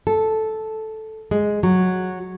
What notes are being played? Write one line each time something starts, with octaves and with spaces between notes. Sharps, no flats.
A4
G#3
F#3